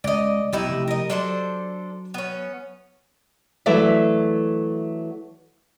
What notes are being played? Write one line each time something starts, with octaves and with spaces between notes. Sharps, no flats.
C#2 D5 D#5
B1 D#4 E4 G4
F1
A#4 D#5
F#3 D4 A4 C5
B3 C#4
E3 F#3 A3 A4 D5 E5